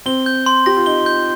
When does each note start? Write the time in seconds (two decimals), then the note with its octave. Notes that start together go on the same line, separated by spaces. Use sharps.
0.06 C4 G7
0.26 G6
0.46 C6
0.66 G4 A#6
0.77 F4
0.86 D#4 G7
1.06 G6